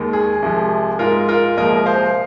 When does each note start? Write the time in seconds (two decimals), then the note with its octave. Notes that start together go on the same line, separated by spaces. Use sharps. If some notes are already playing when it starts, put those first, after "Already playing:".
Already playing: D#2 D#3 G#3
0.13 G#4
0.42 C2 C3 F3 G#3
0.99 G#2 G#3 F4 A#4
1.29 F4 A#4
1.57 C2 A#2 F3 G#3 A#4 D#5
1.86 C5 F5